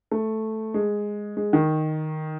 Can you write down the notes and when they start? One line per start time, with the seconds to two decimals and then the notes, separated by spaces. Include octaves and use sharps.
0.11 A3
0.74 G#3
1.37 G#3
1.53 D#3